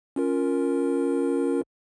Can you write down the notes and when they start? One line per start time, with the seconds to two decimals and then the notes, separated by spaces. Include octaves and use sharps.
0.16 C#4 F4 A#4